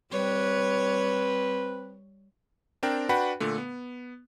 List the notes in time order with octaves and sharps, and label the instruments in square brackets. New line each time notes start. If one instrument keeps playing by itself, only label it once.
[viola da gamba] G3 C#5 [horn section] C4 B4
[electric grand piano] C4 D4 A#4 G5
D4 F#4 B4 F#5 G5 B5
A#2 D3 A3
B3